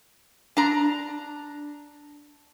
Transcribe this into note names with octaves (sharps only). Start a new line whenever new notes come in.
D4 A#5